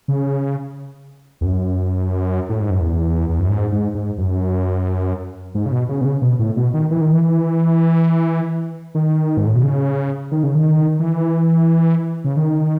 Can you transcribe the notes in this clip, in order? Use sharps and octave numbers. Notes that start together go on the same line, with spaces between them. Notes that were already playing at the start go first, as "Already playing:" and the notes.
C#3
E2
F#2
A2
G#2
F#2
E2
E2
F#2
G#2
G#2
G#2
F#2
G#2
C#3
B2
C#3
B2
C#3
B2
A2
B2
D#3
E3
D#3
E3
D#3
G#2
A2
B2
C#3
D#3
C#3
D#3
E3
C#3
D#3